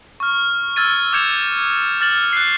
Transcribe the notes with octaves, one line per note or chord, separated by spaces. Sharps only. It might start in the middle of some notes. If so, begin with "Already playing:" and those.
C#6 F6
E6 F6 G#6 A6 D#7
D6 G6 G#6 C#7 E7 F7
F6 A6 F#7
F#6 C7